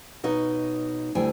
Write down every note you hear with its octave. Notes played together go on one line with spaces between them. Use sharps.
B2 D#4 C#5 D#5
D2 G3 E4 G5 G#5